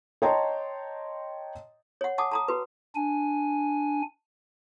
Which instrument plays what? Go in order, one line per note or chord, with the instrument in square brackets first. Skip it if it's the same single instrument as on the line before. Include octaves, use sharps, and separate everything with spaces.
[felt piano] C#5 D#5 G5 A5 A#5 C6
[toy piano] C#5 F#5
F#5 G#5 A5 D6 D#6
A5 A#5 D#6
F#4 B4
[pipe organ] D4 G#5